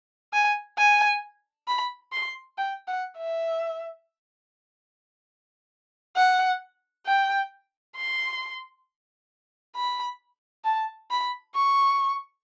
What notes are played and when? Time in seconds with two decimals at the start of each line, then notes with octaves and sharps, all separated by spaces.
0.33 G#5
0.78 G#5
1.68 B5
2.12 C6
2.58 G5
2.88 F#5
3.18 E5
6.16 F#5
7.07 G5
7.96 C6
9.76 B5
10.65 A5
11.11 B5
11.55 C#6